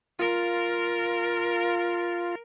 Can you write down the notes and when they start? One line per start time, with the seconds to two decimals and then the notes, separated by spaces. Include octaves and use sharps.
0.19 F4 A#4